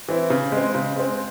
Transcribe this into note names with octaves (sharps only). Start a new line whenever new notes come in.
E3 C4 E4
C#3
G#3 C4
C#3
G#3 C4